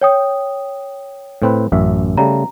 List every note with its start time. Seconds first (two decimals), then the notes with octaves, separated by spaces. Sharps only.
0.01 C#5 G5 D#6
1.42 A2 C4 B4
1.72 A1 F#2 E5
2.17 C#3 G3 A3 A#5